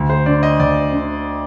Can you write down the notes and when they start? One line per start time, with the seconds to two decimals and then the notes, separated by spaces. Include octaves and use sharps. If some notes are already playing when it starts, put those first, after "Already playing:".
Already playing: D2
0.10 C5
0.26 D3 D5
0.43 D#5
0.59 D2 D5
0.93 D3